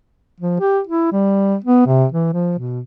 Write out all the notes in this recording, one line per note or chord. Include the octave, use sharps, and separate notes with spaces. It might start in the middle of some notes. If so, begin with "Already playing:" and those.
F3
G4
E4
G3
B3
C3
E3
F3
B2